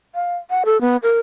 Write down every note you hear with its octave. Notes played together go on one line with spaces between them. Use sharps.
F5
F#5
A4
B3
A#4